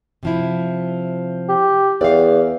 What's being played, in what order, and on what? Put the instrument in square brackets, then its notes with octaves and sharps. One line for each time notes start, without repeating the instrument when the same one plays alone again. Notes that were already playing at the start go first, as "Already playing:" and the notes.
[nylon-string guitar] C3 F3 E4
[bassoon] G4
[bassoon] E2 [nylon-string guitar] D5 F5